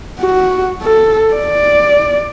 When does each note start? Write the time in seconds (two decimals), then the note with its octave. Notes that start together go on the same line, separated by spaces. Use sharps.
0.19 F#4
0.82 A4
1.34 D5